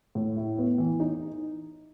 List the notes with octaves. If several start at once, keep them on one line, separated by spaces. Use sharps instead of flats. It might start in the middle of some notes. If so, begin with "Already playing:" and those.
A2
E4
B3
E3
D#4